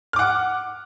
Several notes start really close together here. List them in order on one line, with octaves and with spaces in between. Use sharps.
F6 D6 F#5